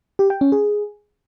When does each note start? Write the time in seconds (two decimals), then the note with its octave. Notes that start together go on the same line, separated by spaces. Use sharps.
0.19 G4
0.30 G5
0.41 C#4
0.52 G#4